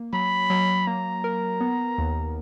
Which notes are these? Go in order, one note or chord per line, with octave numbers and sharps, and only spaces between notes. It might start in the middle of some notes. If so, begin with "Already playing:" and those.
Already playing: A#3
F#3 B5
F#3
A#3 A#5
A#4
B3
D#2